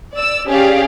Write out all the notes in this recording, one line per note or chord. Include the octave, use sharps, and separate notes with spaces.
D5 E6
C#4 G4 G#4 D5 F5